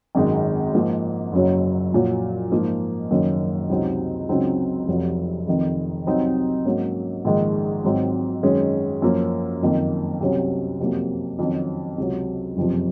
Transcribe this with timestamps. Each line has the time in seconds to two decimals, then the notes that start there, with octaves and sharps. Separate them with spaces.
0.15 G#1 F#2 D#3 G#3
0.74 G#2 F3 A#3
1.33 F#1 F#2 C#3 F#3 C#4
1.92 A#1 A#2 F#3
2.51 G#2 F3 A#3 D#4
3.11 F#1 F#2 D#3 A#3 C#4
3.69 C#2 C3 F#3 C4 D#4
4.29 C#2 C#3 F#3 C4 D#4
4.88 F1 F2 C3 F#3
5.47 F1 F2 D#3
6.06 C2 C3 F#3 C4 D#4
6.65 G#2 F#3 A#3 C#4
7.25 A#1 G#2 D#3 G#3
7.84 G#1 G#2 F#3 C4
8.43 F#2 D#3 G#3 C#4
9.02 F#2 F3 A#3 C#4
9.61 F#1 F2 D#3 A#3
10.20 C2 C3 F#3 C#4
10.80 F2 C3 F#3 A#3
11.39 F2 D#3 F#3 C#4
11.98 C#2 C3 F#3
12.57 F#1 F2 C3 F3